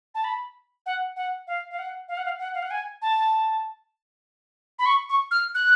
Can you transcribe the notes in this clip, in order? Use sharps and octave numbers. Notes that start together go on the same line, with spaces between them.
A5
B5
F#5
F#5
F5
F5
F#5
F5
F#5
F5
F#5
F5
F#5
G#5
A5
B5
C#6
C#6
F6
F#6